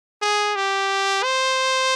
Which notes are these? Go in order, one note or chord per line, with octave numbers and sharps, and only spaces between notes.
G#4
G4
C5